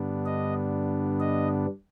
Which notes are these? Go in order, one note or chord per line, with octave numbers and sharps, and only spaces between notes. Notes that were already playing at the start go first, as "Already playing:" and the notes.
Already playing: G2 D3 G3 B3 D4
D#5
D#5